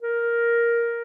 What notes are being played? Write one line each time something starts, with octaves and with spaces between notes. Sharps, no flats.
A#4